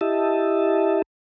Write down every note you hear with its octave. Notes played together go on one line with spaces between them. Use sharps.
E4 G4 D#5 E5 A5